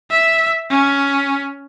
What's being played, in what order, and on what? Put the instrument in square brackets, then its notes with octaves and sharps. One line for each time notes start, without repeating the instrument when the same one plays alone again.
[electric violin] E5
C#4